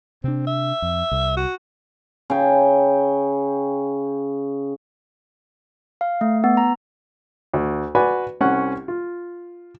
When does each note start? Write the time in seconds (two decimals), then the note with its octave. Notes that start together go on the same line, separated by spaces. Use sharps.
0.24 C3 C4 D4
0.47 E5
0.82 F2
1.11 C2
1.37 F#4
2.30 C#3 G5
6.01 F5
6.21 A3
6.44 B3
6.57 A#5
7.53 D2
7.95 F#4 B4 D5 G#5 B5
8.41 C2 C#4 F#5
8.88 F4